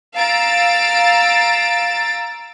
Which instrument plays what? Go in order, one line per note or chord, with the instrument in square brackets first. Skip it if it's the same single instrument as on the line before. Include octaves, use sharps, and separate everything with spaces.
[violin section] F5 A#5 E6 A6 D7